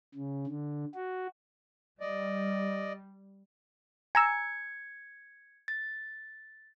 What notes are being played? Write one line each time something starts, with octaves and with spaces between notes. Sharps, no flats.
C#3
D3
F#4
G3 D5 D#5
G#5 A#5 E6 G#6 C#7
A6